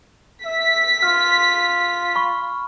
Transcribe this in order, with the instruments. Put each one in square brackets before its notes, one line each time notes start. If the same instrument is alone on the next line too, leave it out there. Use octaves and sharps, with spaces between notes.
[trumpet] E5 [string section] B6
[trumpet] F4 [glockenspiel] F6
[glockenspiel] B5 C#6